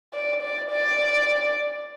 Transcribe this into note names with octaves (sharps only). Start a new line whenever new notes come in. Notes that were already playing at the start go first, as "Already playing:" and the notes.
D5
D5
D5